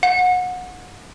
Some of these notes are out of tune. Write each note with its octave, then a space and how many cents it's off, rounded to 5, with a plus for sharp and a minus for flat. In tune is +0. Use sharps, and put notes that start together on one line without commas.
F#5 -25